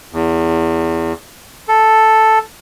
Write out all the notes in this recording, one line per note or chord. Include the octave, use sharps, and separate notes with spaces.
E2
A4